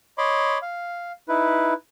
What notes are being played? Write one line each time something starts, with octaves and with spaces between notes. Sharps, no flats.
C#5 D#5 B5 C6 D6
F5
D#4 E4 B4